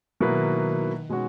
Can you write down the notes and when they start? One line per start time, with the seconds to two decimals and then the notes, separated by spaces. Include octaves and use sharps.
0.20 B2 D#3 F#3 A#3 E4 B4
1.09 B2 G#3 C#4 F#4